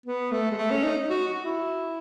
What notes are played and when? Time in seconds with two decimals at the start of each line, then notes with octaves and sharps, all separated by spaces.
0.06 B3
0.32 A3
0.51 G#3
0.57 A3
0.70 C#4
0.83 D#4
1.09 F#4
1.27 F#4
1.44 E4